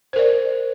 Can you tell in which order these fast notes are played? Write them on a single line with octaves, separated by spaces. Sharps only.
C5 A#4 D5